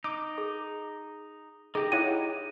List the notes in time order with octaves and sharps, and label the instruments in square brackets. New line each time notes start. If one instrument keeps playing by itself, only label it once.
[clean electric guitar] D#4 [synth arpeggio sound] D6
[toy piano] G#4
[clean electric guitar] D#4 G4 D#5 [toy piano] G#4
[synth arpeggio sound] E4 C#5 F#5 [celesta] D#7